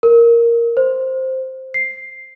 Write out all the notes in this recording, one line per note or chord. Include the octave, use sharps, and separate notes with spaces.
A#4
C5
C7